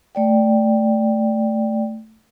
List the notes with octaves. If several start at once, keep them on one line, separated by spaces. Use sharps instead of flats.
A3 D5 G5